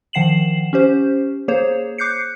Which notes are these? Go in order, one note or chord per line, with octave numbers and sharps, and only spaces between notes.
D#3 F3 F#5 C7 E7 F#7
C#4 G4 C5
A#3 G#4 C5 C#5
D6 F#6 G6 C7 C#7